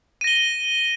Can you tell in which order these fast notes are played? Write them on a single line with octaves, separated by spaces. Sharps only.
D#7 A#6 G7